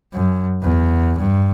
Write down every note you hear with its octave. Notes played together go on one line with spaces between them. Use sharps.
F#2
E2
G2